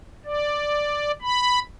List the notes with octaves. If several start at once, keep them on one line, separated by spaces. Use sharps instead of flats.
D5
B5